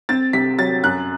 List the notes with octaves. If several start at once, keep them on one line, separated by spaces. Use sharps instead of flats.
C4 A6
C3 B6
F#3 A6
F#2 F#6